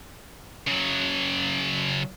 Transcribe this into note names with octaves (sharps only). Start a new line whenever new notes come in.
C#3 F#3